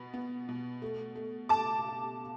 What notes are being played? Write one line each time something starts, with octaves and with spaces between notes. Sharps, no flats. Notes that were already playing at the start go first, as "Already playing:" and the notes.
Already playing: B2 B3 B5
B3
B2
A3
A3
A3 A5 D6